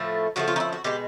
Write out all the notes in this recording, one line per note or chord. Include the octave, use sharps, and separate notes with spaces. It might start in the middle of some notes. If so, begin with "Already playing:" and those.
Already playing: A2 F3 A3
C#3 F3 A3 F#4
F4
D#4
E4
F#4
B2 G#3 G4